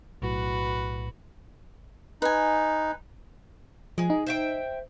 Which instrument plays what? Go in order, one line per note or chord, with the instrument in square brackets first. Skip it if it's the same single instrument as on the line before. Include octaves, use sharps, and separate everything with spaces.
[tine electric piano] B1 A2 [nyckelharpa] F#4 B4
[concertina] D#4 [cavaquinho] B4 G#5
[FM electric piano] F3 [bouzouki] G#3 G#4
[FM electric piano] D#4
[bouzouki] C5 E5 G5